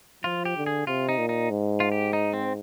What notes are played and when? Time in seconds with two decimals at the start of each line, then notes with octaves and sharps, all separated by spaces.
0.24 F3 F4
0.45 G4
0.56 D3
0.66 G#4
0.87 C3 F4
1.09 D#4
1.18 A#2
1.29 D#4
1.50 G#2
1.80 F4
1.92 G4
2.13 D#4
2.33 C4